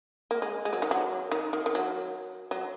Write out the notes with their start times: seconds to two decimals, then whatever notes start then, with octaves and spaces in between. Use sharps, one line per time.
0.31 A#3
0.42 G#3
0.65 G#3
0.73 F#3
0.82 D#3
0.91 F#3
1.31 D#3
1.53 D#3
1.66 D#3
1.75 F#3
2.51 F#3